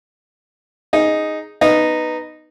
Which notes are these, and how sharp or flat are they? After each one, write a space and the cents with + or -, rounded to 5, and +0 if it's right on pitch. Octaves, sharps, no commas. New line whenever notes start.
D#4 +0 G#4 +0
B3 +0 D#4 -10